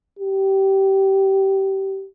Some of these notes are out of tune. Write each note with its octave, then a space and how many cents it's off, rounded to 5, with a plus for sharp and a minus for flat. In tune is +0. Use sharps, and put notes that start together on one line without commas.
G4 -20